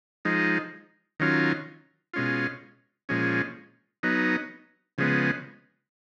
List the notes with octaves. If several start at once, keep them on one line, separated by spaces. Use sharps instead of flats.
F3 G#3 D#4
D#3 F#3 C#4 F4
B2 G#3 C#4 F4
A#2 F3 G#3 C#4
F#3 B3 D#4
C#3 F3 G#3 B3